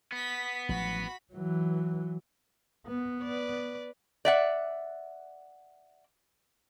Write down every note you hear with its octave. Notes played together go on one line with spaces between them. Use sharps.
B3 D#6 B6
A1 F3 F#3 F#4 B5
E3 F#3
B3
B4 D5
D5 E5 F#5